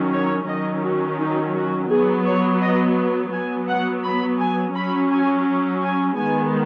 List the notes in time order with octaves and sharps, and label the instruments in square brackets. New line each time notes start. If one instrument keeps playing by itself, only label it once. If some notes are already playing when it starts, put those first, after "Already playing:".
Already playing: [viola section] D#3 F#3 C#4
C#5
D#3 F#3 C#4 D#5
F#4
D#4
F#4
F#3 B3 G#4
C#5
D#5
F#3 B3 G#5
F#5
B5
G#5
F#3 C#4 B5
G#5
G#5
D#3 G#3 B3 G#5